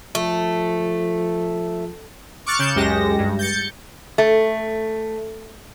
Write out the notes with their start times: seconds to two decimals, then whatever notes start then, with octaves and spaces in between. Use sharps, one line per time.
0.15 F3 A3
2.46 C#6 D6 F6 F#6 A6 C#7
2.59 C#3 G6 C#7 E7
2.75 C#2 F#2 G#3 G4 A#6
3.18 G2
3.39 G6 A6 C#7
4.18 A3